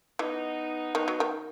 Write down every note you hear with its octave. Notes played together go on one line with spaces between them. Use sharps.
E3 B3 D#4
D#3 B3 D#4
F#3
D#3